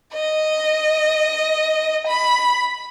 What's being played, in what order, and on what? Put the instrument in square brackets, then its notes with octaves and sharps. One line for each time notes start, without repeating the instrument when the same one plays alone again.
[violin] D#5
B5